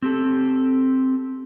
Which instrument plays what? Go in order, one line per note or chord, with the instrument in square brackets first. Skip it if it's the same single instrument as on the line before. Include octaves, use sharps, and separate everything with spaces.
[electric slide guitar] C4 G4 A4